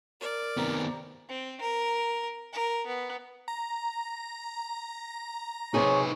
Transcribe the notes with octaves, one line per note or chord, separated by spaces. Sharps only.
A#4 D5
C3 D#3 B3 A#5
C4
A#4
A#4
B3
A#5
C3 D#4 G#4 B4 C#5